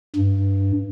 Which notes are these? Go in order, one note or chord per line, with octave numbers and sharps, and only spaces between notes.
G2